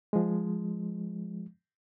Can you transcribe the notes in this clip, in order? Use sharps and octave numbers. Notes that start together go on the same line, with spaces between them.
F3 G#3